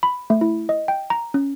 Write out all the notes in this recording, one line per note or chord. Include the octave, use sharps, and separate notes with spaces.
B5
A3
E4
D#5
G5
A#5
C#4